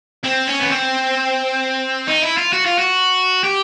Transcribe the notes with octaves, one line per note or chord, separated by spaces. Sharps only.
C4
C#4
B3
C4
D#4
E4
F4
F#4
F4
F#4
G4